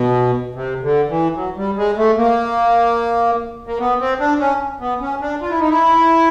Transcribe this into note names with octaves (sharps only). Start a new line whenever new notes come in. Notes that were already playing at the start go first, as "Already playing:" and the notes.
Already playing: B2
C3
D3
E3
F#3
G3
G#3
A3
A#3
A#3
B3
C4
D4
C#4
B3
C#4
D4
F4
E4
D#4
E4